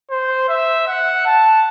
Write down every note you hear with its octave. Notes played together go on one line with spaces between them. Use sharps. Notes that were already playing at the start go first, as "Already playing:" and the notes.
C5
E5
F#5
A5